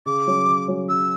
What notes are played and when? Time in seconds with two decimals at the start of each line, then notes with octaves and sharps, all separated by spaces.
0.06 C#3 D6
0.27 F#3 C#4
0.47 C#3
0.68 F#3 C#4
0.89 C#3 E6